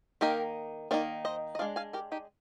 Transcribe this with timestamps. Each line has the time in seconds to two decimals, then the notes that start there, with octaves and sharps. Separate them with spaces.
0.21 D#3 A#3 D#4 G4 A#4
0.91 D#3 A#3 D#4 A#4 D5
1.25 C5 D#5
1.55 D#5
1.59 G#3 D4 D5 F5
1.76 F5 G#5
1.93 G4 A#4
2.12 D#4 G4